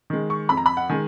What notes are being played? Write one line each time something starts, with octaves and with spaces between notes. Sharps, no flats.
D#3 G#3
C#6
F2 B5
A#5
B5
F#5
D#3 G#3 G#5